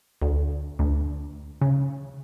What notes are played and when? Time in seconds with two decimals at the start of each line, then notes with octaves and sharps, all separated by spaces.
0.22 D2
0.79 D2
1.61 C#3